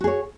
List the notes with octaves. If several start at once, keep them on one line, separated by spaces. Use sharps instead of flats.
F#4 G#4 C#5